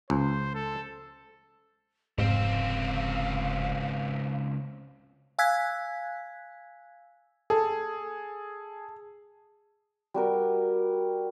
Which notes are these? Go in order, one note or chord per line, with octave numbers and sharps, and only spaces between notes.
C#2 C5
A4
F1 C#2 G#2 C4 F5
F5 G#5 E6 F#6 G#6 B6
G#4 A4
G3 F#4 A#4